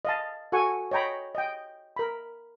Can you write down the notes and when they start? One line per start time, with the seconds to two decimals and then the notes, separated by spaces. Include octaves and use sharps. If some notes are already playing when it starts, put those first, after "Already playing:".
0.05 D#5 F5 A5
0.52 F#4 A4 F#5 G#5 C#6
0.91 C#5 D#5 G5 A#5 B5
1.35 D#5 G5
1.96 A#4 B5